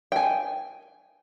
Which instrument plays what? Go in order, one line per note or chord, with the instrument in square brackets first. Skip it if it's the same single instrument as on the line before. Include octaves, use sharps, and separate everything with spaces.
[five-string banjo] G5 G#5